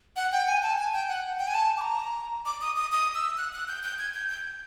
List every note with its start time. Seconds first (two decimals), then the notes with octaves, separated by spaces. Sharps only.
0.16 F#5
0.32 G5
0.47 G#5
0.63 A5
0.78 G#5
0.93 G5
1.09 F#5
1.39 G5
1.47 G#5
1.54 A5
1.77 D6
1.81 A#5
2.46 D6
2.61 D#6
2.76 D#6
2.92 D#6
3.15 E6
3.37 F#6
3.53 F#6
3.68 G6
3.83 G6
3.99 G#6
4.14 G6
4.29 G6